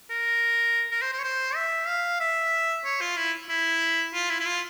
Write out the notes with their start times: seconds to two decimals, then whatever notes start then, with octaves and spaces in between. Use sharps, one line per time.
0.10 A#4
0.91 A#4
1.02 C5
1.13 C5
1.19 C#5
1.23 C5
1.56 E5
1.88 F5
2.20 E5
2.85 C#5
3.01 F4
3.17 E4
3.49 E4
4.14 F4
4.30 E4
4.40 E4
4.46 F4